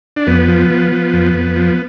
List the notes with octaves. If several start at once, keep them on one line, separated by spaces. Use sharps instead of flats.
D4
F2 B3
F3
F3
F3
F2
F2
F3